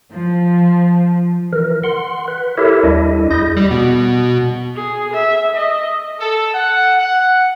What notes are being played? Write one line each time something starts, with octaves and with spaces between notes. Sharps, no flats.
F3
E3 A#4
F#5 C6
B4
E4 G4 A4 A#4 C#5 E5
D#2 G3 D4 E4 D#5
E2 E4 G#4 D#5 G6 A#6
G3
B2
G#4
E5
D#5
A4
F#5
F#5